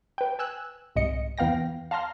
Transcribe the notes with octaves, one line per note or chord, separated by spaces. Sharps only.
B4 G5
G#5 E6 F#6
C2 G#2 D#5 C#7
E2 B3 F5 G5 A#6
F5 A5 A#5 C6 F6